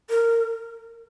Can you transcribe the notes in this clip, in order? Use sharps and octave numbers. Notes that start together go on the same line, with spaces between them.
A#4